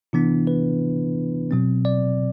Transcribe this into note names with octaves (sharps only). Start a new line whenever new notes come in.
C3 E3 B3 D4 E4
B4
B2 F#3 C4
D5